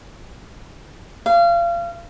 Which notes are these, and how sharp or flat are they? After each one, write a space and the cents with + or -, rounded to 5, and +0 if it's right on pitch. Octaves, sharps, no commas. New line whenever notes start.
F5 -30